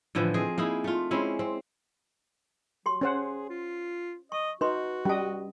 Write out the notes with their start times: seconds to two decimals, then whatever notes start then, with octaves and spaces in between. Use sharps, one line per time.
0.15 A2 D3 E3 F3
0.34 C4 G#4 D#5
0.58 A#3 D#4 E4 G#4
0.84 A3 F4
1.11 G#3 C4 C#4 E4
1.39 C4
2.86 F#3 G4 C6
3.01 C#4 G#4 C5 F#5
3.49 F4
4.32 D#5 C#6
4.61 D#4 F#4 B4 C6
5.05 G3 C#4 D#5 A5